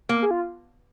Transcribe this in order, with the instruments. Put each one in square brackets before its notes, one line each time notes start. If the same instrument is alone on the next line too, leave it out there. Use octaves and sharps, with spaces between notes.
[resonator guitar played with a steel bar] A#3
[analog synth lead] G#4
F4